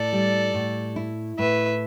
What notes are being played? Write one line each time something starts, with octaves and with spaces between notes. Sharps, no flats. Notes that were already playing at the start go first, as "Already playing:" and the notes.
Already playing: A2 A4 D5
G3
A2
E4
A2 B4 E5